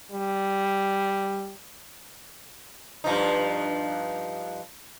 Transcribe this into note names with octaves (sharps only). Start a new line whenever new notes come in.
G3
G2 F3 D#4